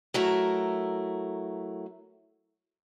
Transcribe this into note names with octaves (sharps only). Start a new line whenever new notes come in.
F#3 A3 E4 A#4